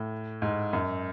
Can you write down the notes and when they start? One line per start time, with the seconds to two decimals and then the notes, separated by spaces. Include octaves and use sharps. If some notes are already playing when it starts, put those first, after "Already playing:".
Already playing: A2
0.42 G#2
0.73 F#2